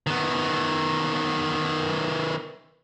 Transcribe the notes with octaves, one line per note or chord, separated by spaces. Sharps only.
D#3 B3